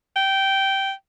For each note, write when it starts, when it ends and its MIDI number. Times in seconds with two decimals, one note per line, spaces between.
0.16 0.92 79